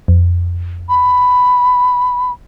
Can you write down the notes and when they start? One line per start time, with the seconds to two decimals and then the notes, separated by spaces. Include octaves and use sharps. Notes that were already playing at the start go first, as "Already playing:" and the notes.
0.08 F2
0.89 B5